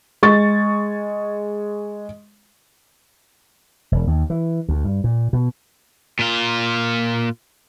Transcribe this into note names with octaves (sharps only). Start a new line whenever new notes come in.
G#3 C#6 A6
E1
D#2
E3
D2
G2
A#2
B2
A#2 F4